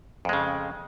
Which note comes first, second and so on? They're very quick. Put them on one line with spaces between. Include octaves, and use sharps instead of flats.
F2 G#3 C#3